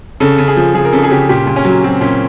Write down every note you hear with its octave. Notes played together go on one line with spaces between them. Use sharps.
C#3 A4
C#3
G#4
F3
F3 G#4
A#4
C#3 A4
G#4
C#3 G4
A#2 G4
A#2
C#4
F#3
F#3 C4
A#2 C#4